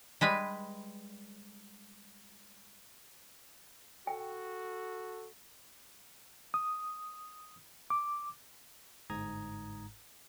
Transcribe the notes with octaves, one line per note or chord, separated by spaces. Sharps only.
G3 G#3 B4
F#4 A4 G5
D#6
D6
G1 G#2 A#5 D#6 G#6